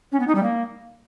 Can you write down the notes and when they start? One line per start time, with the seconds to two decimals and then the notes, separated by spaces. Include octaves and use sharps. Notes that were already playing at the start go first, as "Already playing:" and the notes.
0.12 C#4
0.20 B3
0.27 D#4
0.35 G3
0.43 A#3